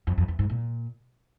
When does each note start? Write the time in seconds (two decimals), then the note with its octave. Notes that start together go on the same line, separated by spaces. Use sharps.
0.07 F2
0.18 F2
0.28 E2
0.39 G#2
0.50 A#2